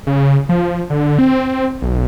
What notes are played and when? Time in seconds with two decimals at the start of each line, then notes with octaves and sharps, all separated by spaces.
0.07 C#3
0.49 F3
0.90 D3
1.19 C4
1.82 B1